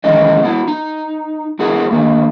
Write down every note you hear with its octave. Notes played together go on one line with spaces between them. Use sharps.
D#3 E3 G#3 C#4 E4 D#5
B3 E4 F#4
D#4
B3 E4 F#4 G#4 A#4
D3 D#3 A#3